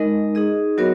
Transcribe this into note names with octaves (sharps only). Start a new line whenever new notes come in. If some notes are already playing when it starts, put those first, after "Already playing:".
Already playing: G#3 D#4 A#4 D#5
D#4 G#4 D#5
F#3 B3 F#4 A#4 C#5